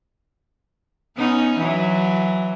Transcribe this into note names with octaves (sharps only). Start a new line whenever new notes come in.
B3 C#4 D#4
E3 F#3